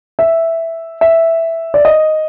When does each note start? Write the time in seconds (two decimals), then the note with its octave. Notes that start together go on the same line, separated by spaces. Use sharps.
0.19 E5
1.01 E5
1.74 D5
1.85 D#5